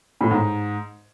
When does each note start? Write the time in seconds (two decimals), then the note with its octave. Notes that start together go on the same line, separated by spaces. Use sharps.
0.21 A2
0.31 G#2